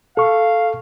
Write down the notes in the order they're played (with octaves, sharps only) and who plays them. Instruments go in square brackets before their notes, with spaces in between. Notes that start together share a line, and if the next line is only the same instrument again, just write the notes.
[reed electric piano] A4 C#6 [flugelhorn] F5